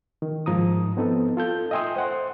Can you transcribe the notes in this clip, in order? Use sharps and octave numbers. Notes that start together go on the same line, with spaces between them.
D#3
G#2 F3 A#5 D#6
B3 C4 D#4 A4
F4 A4 G6
D#5 E5 G5 G#5 C6 D#6
C5 F#5 C6